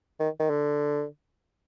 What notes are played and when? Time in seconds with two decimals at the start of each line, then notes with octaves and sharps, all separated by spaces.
0.20 D#3
0.40 D#3
0.50 D3